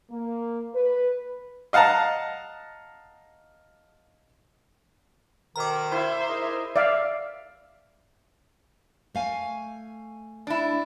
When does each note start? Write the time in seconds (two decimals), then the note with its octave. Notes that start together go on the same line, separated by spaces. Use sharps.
0.10 A#3
0.74 B4
1.73 D#5 F5 F#5 A5 A#5
5.56 D2 B2 D#3 A#5 D6
5.92 E4 C5 E5
6.29 D#4 G#4 A#4
6.76 D5 E5 F5
9.15 A3 F5 G#5
10.47 D4 E4